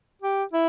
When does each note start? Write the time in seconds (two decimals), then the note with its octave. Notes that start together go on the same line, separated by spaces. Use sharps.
0.22 G4
0.53 E4